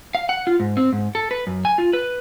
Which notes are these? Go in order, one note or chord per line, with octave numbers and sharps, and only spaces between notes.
F5
F#5
F4
G#2
C4
G#2
A4
B4
F#2
G#5
F4
B4